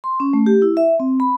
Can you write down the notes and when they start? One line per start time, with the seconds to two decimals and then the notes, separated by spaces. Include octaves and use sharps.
0.04 C6
0.20 C#4
0.33 A3
0.46 G4
0.62 E4
0.77 E5
1.00 C4
1.20 B5